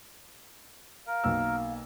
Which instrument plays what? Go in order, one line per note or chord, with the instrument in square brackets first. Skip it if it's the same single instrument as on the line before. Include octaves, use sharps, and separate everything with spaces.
[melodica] A#4 [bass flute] F5
[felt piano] B1 A#3 E6